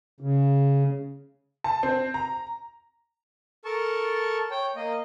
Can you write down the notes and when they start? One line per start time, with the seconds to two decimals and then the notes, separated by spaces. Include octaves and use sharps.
0.20 C#3
1.64 A5
1.83 C4
2.14 A#5
3.65 A4 A#4 A5 C#6
4.51 C#5 G5
4.76 A#3 D#5